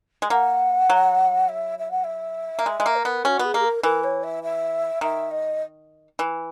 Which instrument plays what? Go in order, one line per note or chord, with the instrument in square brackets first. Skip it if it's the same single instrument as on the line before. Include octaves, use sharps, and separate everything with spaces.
[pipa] G#3
[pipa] A#3 [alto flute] F#5
[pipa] F#3
[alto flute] E5
E5
F#5
E5
[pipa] A#3
[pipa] G#3 [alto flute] E5
[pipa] G#3
A#3
[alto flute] A#4
[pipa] B3
[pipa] C#4 [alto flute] F#4
[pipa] B3 [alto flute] G#4
[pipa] A#3
[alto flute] G#4
A#4
[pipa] E3 [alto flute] A#4
[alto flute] C#5
E5
E5
[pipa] D#3 [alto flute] E5
[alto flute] D#5
[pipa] E3